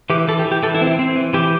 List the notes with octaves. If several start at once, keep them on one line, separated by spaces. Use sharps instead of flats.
E3 G4
E3 A4
G4
E3
G4
E3 A4
E4
C4
E4
C4
E3
E3 G4